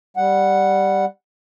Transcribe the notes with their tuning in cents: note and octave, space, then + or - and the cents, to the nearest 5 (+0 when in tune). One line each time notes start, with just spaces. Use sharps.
G3 +0 F#5 +0